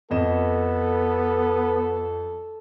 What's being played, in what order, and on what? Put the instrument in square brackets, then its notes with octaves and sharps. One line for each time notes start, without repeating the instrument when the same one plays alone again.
[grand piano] F2 D#5 E7 [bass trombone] B3 [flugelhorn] A4